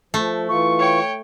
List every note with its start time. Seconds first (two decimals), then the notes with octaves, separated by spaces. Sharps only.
0.14 F3 A3
0.49 E3 F4 C#6
0.79 C#5 G5